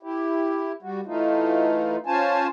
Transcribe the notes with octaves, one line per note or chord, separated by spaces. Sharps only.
E4 G4
G3 F#4
E3 A3 D#4 F4
C#4 F4 C5 G#5 A5